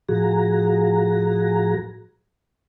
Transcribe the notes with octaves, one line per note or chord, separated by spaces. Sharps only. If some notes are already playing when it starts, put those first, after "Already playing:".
A2 F3 F#4 G#4 A#5